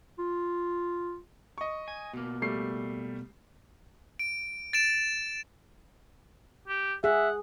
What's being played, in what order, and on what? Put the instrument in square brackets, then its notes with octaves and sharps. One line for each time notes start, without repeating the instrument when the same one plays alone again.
[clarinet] F4
[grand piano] D#5 C#6
[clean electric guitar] G#5
B2 A#3
[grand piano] G3 A3 C7
[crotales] D7
A6 D7 E7
[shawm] G4
[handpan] G#4 [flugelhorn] E5 [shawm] F#5